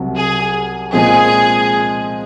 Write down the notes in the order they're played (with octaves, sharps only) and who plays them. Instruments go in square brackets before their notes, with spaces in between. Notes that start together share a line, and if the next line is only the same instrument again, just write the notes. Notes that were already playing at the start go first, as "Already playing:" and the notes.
Already playing: [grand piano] C2 C3 F#3
[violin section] G#4
[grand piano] A#2 F3 G#3 C4 [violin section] G#4